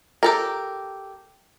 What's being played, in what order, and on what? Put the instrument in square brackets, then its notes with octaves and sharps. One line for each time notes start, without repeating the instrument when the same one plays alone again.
[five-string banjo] G4 A4 A#4